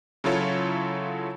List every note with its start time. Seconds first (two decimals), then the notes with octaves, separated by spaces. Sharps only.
0.24 C#3 F#3 E4 F4 A4 C#5